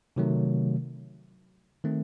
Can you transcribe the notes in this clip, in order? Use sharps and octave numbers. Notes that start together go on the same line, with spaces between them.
C3 D#3 F#3 A3
D#3 A3 C4